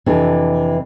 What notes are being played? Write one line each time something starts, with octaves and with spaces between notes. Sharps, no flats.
F2 C3 E3 D4